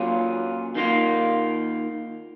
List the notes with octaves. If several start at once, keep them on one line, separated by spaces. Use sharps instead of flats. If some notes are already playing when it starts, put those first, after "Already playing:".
Already playing: A#2 F#3 C#4 F4
D#3 A#3 F4